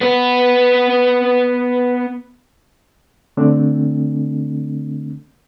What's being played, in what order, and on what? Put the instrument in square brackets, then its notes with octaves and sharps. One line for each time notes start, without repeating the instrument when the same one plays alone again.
[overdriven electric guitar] B3 B4
[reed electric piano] D3 A3 C4 D4